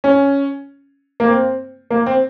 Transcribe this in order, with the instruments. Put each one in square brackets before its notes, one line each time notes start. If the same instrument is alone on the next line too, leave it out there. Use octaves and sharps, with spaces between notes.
[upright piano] C#4
A#3
C4
A#3
C4